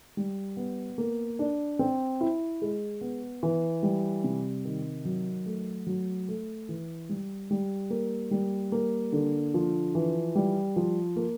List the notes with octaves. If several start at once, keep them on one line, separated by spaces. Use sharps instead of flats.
G3
B3
A#3
D4
C4
E4
G#3
B3
E3
G3
C3
D#3
F#3
A3
F#3
A3
E3
G3
G3
A#3
G3
A#3
D3
F3
E3
G3
F3
A#3